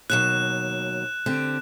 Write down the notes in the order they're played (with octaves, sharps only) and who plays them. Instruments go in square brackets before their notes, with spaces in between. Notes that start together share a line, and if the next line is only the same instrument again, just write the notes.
[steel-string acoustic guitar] D#2 B2 F#3 [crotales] F#6 E7
[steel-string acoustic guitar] D3 C4 G4